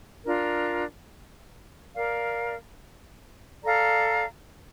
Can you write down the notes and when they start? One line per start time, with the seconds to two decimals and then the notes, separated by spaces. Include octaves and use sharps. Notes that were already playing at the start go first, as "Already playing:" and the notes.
0.24 D4 F4 A#4
1.95 A#4 D5 F5
3.65 A4 D5 F5 A#5